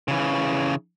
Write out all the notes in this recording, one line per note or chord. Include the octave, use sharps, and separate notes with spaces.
C#3 E3